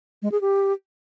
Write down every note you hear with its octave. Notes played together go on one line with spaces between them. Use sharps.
G#3
G#4
G4